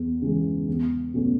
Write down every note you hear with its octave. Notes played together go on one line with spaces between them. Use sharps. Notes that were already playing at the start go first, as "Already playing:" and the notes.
Already playing: E2
C#3 E3 G#3
E2
B2 A3 C#4